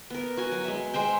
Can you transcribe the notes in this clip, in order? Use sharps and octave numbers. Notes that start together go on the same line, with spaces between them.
B3 A#4
F#4 G#5
F#3
G#3 E5
G#3 C5 E5 G5